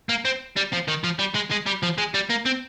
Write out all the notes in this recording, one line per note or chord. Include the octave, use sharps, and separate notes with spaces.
A#3
C4
G3
F3
D#3
F3
G3
G#3
G#3
G3
F3
G#3
G3
A#3
C4